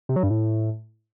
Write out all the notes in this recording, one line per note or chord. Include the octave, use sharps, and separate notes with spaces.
C3
F#3
G2
A2